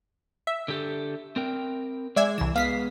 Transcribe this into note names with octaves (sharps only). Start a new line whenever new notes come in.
E5
D3 G4 A4
C4 A#4 G5
G#3 D5 E5 G#5
C2 E3 E7
G#3 B3 F5 B6 C7